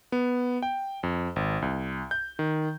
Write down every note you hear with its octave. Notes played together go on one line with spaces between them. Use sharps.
B3
G5
F2
G#1
C2
G6
D#3